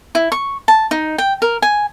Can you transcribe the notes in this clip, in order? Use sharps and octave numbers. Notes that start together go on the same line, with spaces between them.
E4
C#6
A5
D#4
G5
A#4
G#5